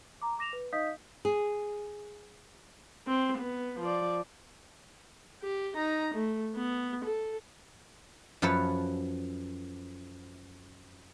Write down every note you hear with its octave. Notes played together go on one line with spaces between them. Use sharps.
A#5 D6
D6 A#6 E7 F7
B4
D#4 D#5 F5 D#6 G6 B6
G#4
C4
B3
F3 D5
G4
D#4 A#5
A3
B3
A4
F#2 F3 A4 B4 C#5